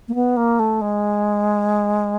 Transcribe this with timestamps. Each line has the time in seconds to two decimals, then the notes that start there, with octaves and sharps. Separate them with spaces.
0.08 A#3
0.15 B3
0.37 A#3
0.59 A3
0.81 G#3